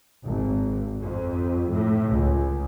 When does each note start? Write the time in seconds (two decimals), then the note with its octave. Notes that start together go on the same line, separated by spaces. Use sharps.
0.24 G#1
1.01 F2
1.71 A2
2.08 C#2